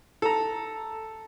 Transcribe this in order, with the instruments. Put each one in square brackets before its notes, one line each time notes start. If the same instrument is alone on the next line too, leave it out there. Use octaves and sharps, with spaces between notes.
[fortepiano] A4 A#5